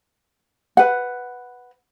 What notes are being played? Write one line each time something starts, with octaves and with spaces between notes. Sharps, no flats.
B4 F#5